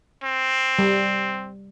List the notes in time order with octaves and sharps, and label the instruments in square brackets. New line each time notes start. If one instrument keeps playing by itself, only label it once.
[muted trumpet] C4
[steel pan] G3